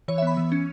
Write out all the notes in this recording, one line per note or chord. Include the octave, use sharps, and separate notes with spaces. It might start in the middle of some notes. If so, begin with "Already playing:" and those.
E3 C#5
E5
B3 B5
E3
C#4